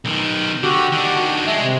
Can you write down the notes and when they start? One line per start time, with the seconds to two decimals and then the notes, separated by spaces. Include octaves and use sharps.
0.05 B1 D#3
0.63 D3 F#4 G4
0.92 D#3 D4
1.47 G#3 E5
1.61 C3